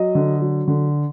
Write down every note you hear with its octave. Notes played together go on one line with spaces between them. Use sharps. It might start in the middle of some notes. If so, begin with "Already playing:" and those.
Already playing: F#3 D#5
D3
F#3
D3